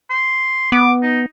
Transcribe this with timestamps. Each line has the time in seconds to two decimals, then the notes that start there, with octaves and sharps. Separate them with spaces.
0.10 C6
0.72 B3 D6
1.02 D#4